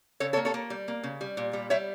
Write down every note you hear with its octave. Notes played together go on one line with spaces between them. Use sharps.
C#3 A4 C#5
A4 C#5
A#3
A4 C#5
A#3
G3
A#3
C#3
G3
A#2
G3
G3 C#5 E5